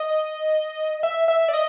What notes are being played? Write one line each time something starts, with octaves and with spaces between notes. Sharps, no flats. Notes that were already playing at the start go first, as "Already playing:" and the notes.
Already playing: D#5
E5
E5
D5
D#5